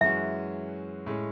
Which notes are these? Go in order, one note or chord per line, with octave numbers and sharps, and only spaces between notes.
F#2 E3 G#3 C#4 F#4 E5
A2 G#3 C#4